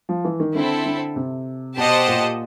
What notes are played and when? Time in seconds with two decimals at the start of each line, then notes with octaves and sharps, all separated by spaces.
0.09 F3
0.25 E3
0.40 D#3
0.54 D3 C4 E4 A4
0.85 D3
1.16 C3
1.77 B2 G4 C5 D#5 F#5 A5
2.08 A#2